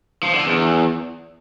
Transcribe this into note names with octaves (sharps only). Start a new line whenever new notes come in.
F3
D3
E2